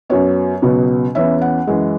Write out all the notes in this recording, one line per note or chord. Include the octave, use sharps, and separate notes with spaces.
F#2 F#3 B3 C#5
C#2 B2 F#3 B3
E2 E3 C#4 E5
F#5
F#2 E3 G#3